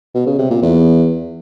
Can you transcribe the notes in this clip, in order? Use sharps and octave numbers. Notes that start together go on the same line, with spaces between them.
B2
C#3
C3
A#2
E2